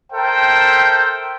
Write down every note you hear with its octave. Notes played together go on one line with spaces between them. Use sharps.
A4 A#4 C5 E5 G5